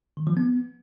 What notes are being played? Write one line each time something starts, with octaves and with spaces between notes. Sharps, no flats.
D#3
F3
B3